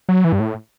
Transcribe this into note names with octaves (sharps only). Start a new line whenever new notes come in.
F#3
E3
G2
A2